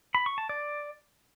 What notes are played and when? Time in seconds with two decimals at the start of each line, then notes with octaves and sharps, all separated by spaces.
0.15 B5
0.26 C#6
0.38 A5
0.49 D5